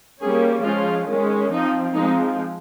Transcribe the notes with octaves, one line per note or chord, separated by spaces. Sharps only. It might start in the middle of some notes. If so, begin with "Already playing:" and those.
G3 A#3 C#4 G#4
F3 G#3 C#4 F4
D#3 G#3 C#4
F3 C4 D#4
F3 G#3 C4 D#4